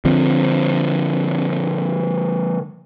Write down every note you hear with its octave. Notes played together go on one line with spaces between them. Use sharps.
D3 F3 C4